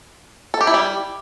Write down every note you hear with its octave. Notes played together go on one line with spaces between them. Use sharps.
A4
G4
E4
G3